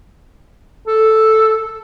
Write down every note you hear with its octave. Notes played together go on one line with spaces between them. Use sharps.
A4